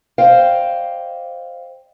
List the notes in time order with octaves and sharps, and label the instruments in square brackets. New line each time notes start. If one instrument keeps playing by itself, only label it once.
[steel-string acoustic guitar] C5 D5 D#5 F5 G5